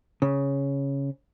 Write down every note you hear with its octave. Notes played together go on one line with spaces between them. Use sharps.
C#3